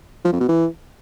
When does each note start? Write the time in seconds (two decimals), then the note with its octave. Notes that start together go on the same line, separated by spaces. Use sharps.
0.24 F3
0.32 F2
0.40 B2
0.48 E3